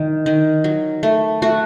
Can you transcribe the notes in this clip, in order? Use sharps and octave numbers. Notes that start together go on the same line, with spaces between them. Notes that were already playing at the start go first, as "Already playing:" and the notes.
Already playing: D#3
D#3
F#3
A3
A3 F#4